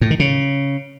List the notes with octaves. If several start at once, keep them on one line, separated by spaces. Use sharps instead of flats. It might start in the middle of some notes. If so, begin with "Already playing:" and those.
A2
D#3
C#3